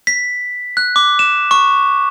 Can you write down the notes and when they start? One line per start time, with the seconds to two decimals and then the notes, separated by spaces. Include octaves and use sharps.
0.07 B6
0.77 F#6
0.96 D6
1.19 E7
1.51 C#6